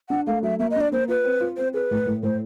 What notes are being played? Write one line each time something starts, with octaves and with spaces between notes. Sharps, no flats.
D4 F#5
A3 F5
F#3 E5
A#3 E5
D#5
D4 D5
A#3 C5
F4 B4
C4
F4
C4 C5
G#4 B4
A2
A2
A2 C5